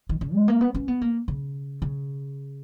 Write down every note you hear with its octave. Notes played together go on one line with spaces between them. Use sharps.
D#3
C#3
G#3
A#3
B3
C#4
B3
A#3
C#3
C#3